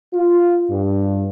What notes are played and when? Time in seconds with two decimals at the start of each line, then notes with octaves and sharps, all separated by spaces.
0.13 F4
0.70 G2